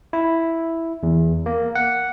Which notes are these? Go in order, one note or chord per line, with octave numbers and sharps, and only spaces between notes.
E4
E2
A#3
F#5